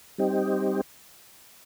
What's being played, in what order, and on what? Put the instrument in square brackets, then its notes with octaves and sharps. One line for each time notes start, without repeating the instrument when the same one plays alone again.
[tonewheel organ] G3 C4 D#4 G4